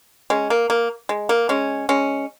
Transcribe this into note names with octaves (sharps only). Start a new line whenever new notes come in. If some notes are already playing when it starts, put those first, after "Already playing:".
G#3 C#4
A#3
A#3
G#3
A#3
G#3 C#4
G#3 C#4